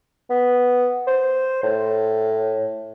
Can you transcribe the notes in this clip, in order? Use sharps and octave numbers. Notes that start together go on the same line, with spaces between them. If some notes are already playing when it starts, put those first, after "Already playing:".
B3
C5
A2